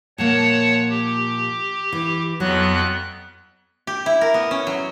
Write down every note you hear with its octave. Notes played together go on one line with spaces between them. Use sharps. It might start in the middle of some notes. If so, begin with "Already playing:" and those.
A#2 F3 A#3 C#5 F#5 A5
G4
E3
F2 F#3 B3 F#6
G4
E4
A#4
B3
C#4
F#3